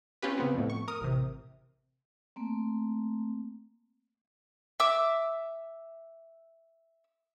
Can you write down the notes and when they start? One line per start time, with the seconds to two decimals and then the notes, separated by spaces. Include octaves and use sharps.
0.22 C4 C#4 F4 G4 B4
0.38 C#3 B3 C4
0.54 F2 A2
0.70 C#6
0.88 A#4 D#6
1.01 A1 C3
2.36 A3 A#3 C4
4.80 E5 D6 E6